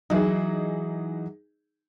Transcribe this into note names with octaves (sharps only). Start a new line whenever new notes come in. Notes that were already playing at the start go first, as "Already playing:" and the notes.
E3 F#3 D#4 G#4